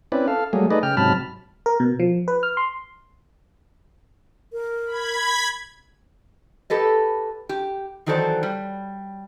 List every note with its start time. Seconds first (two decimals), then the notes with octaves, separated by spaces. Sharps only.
0.12 C4 C#4 E4 B4 D5
0.28 A4 F5
0.53 F#3 G3 A3 A#3 G#4
0.70 A3 D#4 G#4 B4 D5 D#5
0.83 C#3 G5 F6
0.97 G#2 C3 F#3 A5 B5 F6
1.66 A#4
1.80 B2
2.00 F3
2.28 B4
2.43 F6
2.57 C6
4.53 A#4
4.87 B5 G#6
6.70 G4 A4 B4 D#5
7.49 G4
8.06 D#3 E3 F#3 A4 C5 D5
8.43 G3